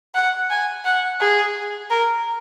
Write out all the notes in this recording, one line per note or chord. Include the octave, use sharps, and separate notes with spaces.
F#5
G#5
F#5
G#4
A#4